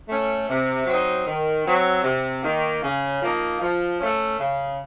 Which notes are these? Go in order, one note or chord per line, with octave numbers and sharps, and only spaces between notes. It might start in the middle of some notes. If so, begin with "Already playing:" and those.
A3 C#4
C3
F#3 C4 D#4
D#3
F#3 C4
C3
D#3 A#3
C#3
F3 A#3 D#4
F3
A3 C#4
C#3